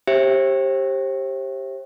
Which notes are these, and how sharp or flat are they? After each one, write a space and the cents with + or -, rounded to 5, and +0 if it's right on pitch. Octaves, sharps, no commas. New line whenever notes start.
G4 +0 C5 +40 E5 +0